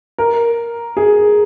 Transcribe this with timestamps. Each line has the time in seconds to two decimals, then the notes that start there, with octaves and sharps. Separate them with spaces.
0.18 A#4
0.97 G#4